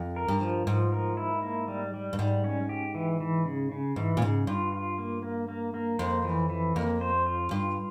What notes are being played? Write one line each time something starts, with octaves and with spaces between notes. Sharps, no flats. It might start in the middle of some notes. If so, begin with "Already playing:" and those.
Already playing: F2
A#4
G2
F3
G#2 F3
A#4
E4
A#3
G3
G3
G2
G#2 G3
C#4
G4
E3
E3
C#3
C#3
G#2 E3
A#2
G#2 C#3
G2 F4
F4
A#3
A#3
A#3
A#3
F2 C5
E3
E3
F2 A#3
C5
F4
G2 F4